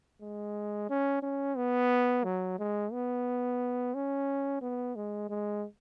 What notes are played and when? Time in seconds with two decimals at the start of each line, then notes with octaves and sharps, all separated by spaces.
0.21 G#3
0.89 C#4
1.22 C#4
1.56 B3
2.24 F#3
2.59 G#3
2.92 B3
3.94 C#4
4.61 B3
4.96 G#3
5.29 G#3